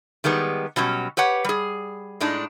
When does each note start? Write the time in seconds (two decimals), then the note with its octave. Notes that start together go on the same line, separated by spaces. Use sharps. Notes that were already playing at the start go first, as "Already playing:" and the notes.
0.24 D#3 G3 G#3 B3
0.76 B2 F#3 G3 C#4
1.17 G4 B4 C#5 F#5
1.44 G3 G#4
2.21 A2 G#3 D4 D#4